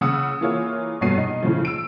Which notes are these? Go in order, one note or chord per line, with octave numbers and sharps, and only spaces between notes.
C#3 F#5 D#6 E6 C#7
E3 A#3 F4 G#4 C#5
F1 G2 B2 C#5 C7 D#7
D#4
A2 C#3 F3
E6 D7